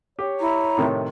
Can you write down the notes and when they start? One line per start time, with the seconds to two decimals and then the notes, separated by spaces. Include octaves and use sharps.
0.19 G4 C#5
0.40 E4 A#5
0.78 A2 C3 D#3